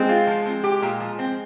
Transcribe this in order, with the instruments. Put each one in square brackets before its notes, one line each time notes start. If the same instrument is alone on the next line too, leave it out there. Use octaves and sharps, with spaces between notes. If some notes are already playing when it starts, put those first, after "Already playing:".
Already playing: [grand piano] G#3 [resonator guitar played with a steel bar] C4
[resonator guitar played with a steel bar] F4
F3
C4
G4
A#2
F3
C4